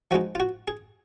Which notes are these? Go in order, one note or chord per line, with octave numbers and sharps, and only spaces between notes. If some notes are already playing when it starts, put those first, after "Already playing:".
F3 G#3 D#4 F#4
F4
F#4
G#4